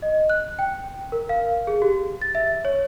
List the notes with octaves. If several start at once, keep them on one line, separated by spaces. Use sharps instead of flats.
D#5
F#6
G5
A#4
F5
G#4
G4
A6
E5
C#5